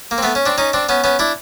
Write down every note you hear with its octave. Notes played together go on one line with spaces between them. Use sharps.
A#3
C4
A3 B3
C#4
C4 D4
C#4 D#4
C4 D4
B3 C#4
B3 C#4
D4 E4